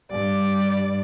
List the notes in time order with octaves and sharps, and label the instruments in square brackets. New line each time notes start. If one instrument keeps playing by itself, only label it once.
[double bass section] G2 [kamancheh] D5